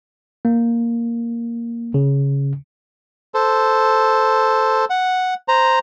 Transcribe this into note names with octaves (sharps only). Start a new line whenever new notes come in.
A#3
C#3
A4 C5
F#5
C5 A#5